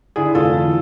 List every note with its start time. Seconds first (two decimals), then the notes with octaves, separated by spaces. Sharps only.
0.16 D3 E4 G#4
0.35 F1 F4 A4
0.53 E3